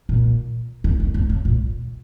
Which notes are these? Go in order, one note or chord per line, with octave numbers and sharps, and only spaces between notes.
A#2
C#3
D#3
C#3
C#3
A#2